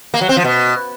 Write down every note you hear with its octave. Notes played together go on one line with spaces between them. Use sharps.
A#3
F#3
C4
F3
B2